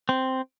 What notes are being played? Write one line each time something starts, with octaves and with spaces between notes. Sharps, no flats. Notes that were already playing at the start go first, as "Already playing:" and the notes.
C4